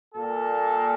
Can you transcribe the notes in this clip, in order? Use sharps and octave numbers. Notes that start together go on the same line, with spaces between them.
A#2 G3 A#3 A4